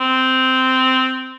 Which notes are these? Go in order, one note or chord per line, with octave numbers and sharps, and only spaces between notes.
C4